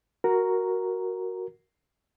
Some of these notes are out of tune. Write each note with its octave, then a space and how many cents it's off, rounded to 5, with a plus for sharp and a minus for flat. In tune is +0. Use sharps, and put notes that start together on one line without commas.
F#4 +0 A#4 +0 A#5 +0